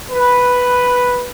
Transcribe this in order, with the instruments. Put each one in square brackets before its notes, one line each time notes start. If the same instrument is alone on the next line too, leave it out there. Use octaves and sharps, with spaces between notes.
[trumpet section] B4